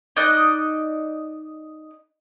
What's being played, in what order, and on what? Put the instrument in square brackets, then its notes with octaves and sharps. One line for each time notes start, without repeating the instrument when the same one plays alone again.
[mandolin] D#4 D5 D#5 F#6